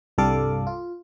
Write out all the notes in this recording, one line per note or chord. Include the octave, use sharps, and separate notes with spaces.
C2 G2 G3 A4 F5 D6
F4